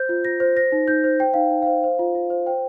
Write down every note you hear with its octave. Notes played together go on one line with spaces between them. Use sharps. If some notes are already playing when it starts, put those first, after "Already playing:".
Already playing: C5 G6
F4
F4 A#6
C5
C5 A#6
D#4
D#4 G6
C5
C5 G5
D#4 F5
D#4
C5 F5
C5
F4
F4
C5
C5 G5